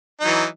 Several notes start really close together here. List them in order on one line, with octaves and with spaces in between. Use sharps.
D#4 F#3 E3